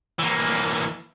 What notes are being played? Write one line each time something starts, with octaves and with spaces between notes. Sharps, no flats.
E3 A#3